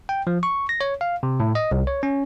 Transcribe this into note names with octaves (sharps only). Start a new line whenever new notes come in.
G5
F3
C#6
A#6
C#5
F5
C3
A2
D#5
C2
C#5
C#4